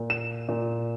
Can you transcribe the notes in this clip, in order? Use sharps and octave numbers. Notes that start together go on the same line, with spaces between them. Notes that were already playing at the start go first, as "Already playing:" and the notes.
Already playing: A#2
E7
A#2